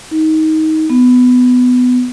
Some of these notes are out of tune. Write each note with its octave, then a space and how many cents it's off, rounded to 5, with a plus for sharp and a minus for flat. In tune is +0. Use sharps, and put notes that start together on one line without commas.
D#4 +20
B3 +15